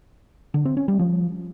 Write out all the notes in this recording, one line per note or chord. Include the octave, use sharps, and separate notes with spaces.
D3
C4
C#4
G3
F3